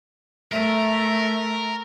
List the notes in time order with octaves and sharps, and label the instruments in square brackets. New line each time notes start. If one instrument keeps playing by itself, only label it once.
[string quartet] A3 [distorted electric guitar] A#4 [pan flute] E5